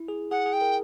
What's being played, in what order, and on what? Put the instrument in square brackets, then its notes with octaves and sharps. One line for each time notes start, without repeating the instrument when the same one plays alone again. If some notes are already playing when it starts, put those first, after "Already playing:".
Already playing: [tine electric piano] E4
G#4
[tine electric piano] G#4 [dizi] F#5
[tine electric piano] G#4
[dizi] G5
[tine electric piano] A#4